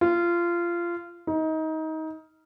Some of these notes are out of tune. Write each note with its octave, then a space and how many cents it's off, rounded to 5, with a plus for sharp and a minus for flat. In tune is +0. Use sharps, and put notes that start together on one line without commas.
F4 -20
D#4 +25